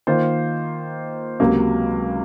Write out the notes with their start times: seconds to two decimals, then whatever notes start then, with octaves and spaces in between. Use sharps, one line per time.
0.07 D#3 A#3 F4 C5
1.40 C#2 C3 F#3 A#3